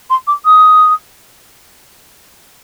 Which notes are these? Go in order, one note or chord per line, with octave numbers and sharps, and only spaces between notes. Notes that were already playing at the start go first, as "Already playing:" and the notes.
C6
D6
D#6